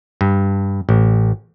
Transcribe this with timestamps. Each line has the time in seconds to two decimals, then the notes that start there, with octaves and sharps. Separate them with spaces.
0.21 G2
0.89 A1